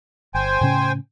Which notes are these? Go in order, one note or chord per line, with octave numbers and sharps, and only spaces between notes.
G1 C5 G5 G#5
A2 C#3 C#4